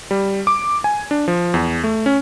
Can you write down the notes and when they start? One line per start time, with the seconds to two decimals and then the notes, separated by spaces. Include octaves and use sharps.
0.11 G3
0.47 D6
0.84 G#5
1.11 D4
1.28 F3
1.54 E2
1.84 A3
2.06 C#4